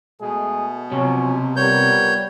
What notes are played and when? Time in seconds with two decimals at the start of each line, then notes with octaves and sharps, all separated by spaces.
0.21 B2 G#3 A3 G#4
0.92 C3 F3 F#3 C#4
1.56 G3 B3 F4 A#4 C#5 G6